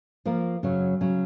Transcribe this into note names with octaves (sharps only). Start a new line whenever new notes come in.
F3 A#3 F4 A#4
F#2 C#3 F#3 C#4
C#3 F#3 C#4